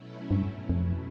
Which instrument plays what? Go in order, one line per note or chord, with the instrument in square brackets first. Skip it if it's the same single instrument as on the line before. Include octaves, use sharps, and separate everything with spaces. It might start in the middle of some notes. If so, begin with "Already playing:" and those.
Already playing: [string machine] B2 F#3 A3 C#4 E4
[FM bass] G2
F2